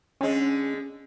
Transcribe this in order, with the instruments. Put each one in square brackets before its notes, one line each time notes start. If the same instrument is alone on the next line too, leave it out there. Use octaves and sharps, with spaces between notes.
[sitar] D3 G#3 [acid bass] C#4